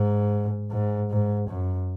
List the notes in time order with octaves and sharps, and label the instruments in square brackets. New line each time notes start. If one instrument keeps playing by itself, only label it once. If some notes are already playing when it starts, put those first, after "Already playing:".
Already playing: [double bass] G#2
G#2
G#2
F#2